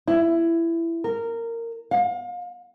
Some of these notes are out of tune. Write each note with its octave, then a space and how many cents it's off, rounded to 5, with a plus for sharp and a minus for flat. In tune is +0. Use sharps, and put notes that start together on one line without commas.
E4 +15
A#4 -15
F5 +35